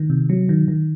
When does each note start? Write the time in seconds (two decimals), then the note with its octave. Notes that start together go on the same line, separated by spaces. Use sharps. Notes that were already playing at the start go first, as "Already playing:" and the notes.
Already playing: D#3
0.10 C3
0.30 F#3
0.49 D#3
0.68 D#3